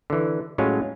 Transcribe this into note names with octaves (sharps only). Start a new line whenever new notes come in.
D3 E3
A2 F#3 G#3 C#4 F4